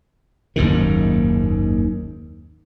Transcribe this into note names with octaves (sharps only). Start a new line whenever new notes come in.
F#1 D#2 G#2 D#3